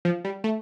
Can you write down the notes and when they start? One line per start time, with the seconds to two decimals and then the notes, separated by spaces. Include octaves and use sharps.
0.05 F3
0.25 G3
0.44 A3